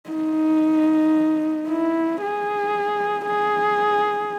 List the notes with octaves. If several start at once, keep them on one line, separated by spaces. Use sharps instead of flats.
D#4
E4
G#4
G#4